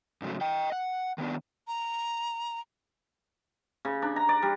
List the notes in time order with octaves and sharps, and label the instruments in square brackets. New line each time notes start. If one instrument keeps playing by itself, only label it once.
[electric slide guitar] G#2 C#3 F#3 A3
D#5 G5
F#5
D#3 B3 D4
[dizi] A#5
[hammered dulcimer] C#3
D4
A#5
D5
G3